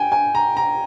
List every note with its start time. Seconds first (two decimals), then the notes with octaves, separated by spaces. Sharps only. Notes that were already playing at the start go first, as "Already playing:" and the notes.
Already playing: G5 G#5
0.12 G#5
0.35 A#5
0.57 A#5